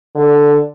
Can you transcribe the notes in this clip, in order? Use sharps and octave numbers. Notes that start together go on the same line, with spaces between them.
D3